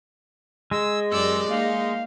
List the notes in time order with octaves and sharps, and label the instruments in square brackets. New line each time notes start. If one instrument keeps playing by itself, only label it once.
[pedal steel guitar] G#3 [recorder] E6
[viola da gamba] F#2 G4 D5 [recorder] E6
[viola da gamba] A#3 D#4 [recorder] F5